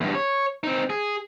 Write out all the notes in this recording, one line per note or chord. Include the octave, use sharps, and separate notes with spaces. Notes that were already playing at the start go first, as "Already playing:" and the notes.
E2 G2
C#5
C4 D#4
G#4